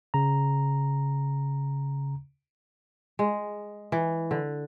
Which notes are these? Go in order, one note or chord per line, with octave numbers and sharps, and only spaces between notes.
C#3 A#5
G#3
E3
D3